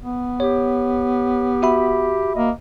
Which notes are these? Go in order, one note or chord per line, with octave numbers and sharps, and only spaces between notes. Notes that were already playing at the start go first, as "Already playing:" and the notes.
B3
G4 C#5
F#4 E5 B5
A#3 D#5